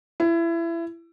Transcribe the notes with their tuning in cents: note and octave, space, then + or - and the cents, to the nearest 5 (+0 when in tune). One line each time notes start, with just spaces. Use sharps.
E4 +25